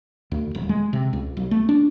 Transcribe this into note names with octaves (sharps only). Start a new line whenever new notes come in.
D2
D#1
G#3
C3
C#2
B1
A3
D4